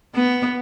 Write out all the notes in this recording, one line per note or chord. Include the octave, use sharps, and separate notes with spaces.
B3